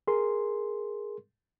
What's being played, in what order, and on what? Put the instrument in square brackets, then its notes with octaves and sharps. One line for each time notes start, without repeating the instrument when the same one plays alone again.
[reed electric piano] G#4 A#4 C6